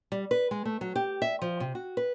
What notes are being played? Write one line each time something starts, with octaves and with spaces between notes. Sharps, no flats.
G3
B4
G#3
A3
F#3
G4
E5
F3
C3
F#4
B4